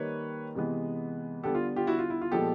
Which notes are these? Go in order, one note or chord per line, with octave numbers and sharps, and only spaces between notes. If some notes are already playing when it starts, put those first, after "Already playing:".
Already playing: D#3 G3 A#3 B4 C#5
C3 E3 G#3 B3
D3 G3 B3 G4 A4
F4
F4 G4
E4 F#4
F4
E4
F4
A#2 F3 G#3 B3 G4 A4